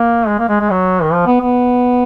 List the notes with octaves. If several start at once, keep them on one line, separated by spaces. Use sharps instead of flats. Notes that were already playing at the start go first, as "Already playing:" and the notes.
Already playing: A#3
G#3
A#3
G#3
G#3
F#3
D#3
F3
B3
B3